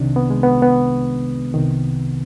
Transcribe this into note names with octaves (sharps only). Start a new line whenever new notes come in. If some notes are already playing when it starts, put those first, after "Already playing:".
Already playing: C2 C3 D#3 D4
B3
G#3
B3
B3
C2 C3 D#3